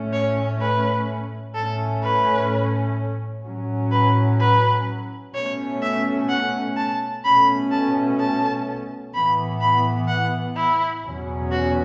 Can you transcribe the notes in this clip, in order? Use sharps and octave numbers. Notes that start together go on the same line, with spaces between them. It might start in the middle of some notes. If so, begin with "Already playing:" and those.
Already playing: A2 A3 C#4
C#5
B4
A2 A3 C#4 A4
B4
A2 F#3 C#4
B4
B4
B2 A3 C#4 C#5
E5
F#5
A5
B2 A3 C#4 B5
A5
A5
A2 E3 B3 B5
B5
F#5
E4
E2 B2 F#3 C#4
F#4